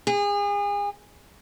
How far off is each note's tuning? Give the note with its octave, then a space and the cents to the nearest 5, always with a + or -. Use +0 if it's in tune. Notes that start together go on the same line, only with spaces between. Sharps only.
G#4 -35